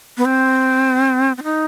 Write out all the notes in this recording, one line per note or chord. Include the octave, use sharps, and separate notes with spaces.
B3
C4
C4
D#4